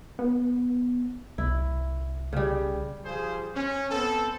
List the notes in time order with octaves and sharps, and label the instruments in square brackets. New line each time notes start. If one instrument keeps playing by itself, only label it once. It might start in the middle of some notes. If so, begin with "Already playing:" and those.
[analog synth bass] B3
[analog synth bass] C2 [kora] E4
[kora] C#3 G3
[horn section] F3 G3 G#4 C5 F5
C#4
B3 C4 A4